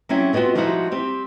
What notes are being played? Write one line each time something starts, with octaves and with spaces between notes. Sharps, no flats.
F#3 G3 C4 C#4 E4
G#3 B3 C4 F4 F#4
F3 G3 G#3 D#4 E4 F#4
G3 C4 G4